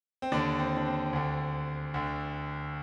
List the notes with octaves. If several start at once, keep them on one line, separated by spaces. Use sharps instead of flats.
C4
D#2 D3 D4
C4
D4
C4
D2 D3
D2 D3